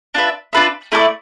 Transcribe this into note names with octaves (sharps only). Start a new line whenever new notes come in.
D4 F4 B4 E5
D4 F4 B4 E5
A3 E4 A4 D5